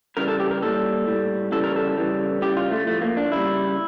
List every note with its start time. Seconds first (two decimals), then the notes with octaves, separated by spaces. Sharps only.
0.17 C#3 E3 G3 A#4
0.28 A4
0.40 G4
0.51 A#4
0.62 A#2 G3 A4
1.07 A2 G3
1.52 C#3 E3 G3 A4
1.64 A#4
1.76 A4
1.97 C#3 E3 G3
2.42 C#3 G3 G4
2.57 F4
2.72 A3
2.87 A2 F3 A3
3.02 A#3
3.17 D4
3.32 C#3 G3 E4